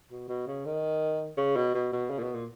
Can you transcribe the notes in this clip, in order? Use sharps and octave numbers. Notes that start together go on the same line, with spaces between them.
B2
B2
C#3
D#3
C#3
B2
B2
B2
C#3
A#2
B2
A#2